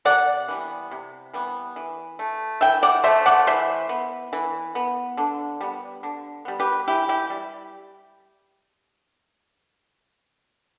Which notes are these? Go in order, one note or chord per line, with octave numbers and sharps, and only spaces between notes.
C3 D5 F#5
E3 G3 B3
C3
E3 G3 B3
E3
A3
E3 E5 G5
D5 F#5
A3 C5 E5
D5 F#5
E3 C5 E5
B3
E3
B3
D3
G3 B3
D3
G3 B3
G4 B4
E3 E4 G4
E4 G4
G3